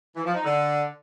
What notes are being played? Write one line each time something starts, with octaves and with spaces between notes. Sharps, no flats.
E3
F3
D#4
D3